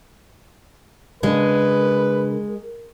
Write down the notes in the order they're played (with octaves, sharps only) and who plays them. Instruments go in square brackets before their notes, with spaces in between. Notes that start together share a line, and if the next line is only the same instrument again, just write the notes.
[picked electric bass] C#3 D4 [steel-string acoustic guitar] G#3 [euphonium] A#4 [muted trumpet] B4